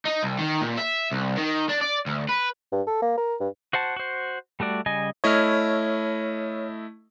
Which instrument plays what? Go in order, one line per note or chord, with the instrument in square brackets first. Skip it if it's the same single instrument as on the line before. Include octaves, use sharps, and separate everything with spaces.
[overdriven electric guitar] D#4
C2
D#3
A#2
E5
C2
D#3
D4
D5
D2
B4
[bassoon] G2
A4
A#3
A#4
G2
[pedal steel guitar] F#4 C5 F#5 A5
F#4 C5
G3 A3 F#4 D5
C#3 G3 D#5 G#5
[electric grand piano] A3 E4 D#5 [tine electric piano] C#5 F6